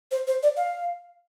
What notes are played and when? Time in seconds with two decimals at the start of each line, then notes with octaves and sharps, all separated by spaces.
0.11 C5
0.27 C5
0.43 D5
0.57 F5